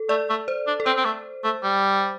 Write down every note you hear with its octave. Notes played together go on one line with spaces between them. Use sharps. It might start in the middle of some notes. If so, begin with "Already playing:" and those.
Already playing: A4
A3 D5
A3
C5
D4
A4
C4 C5
C4
A3
A3
G3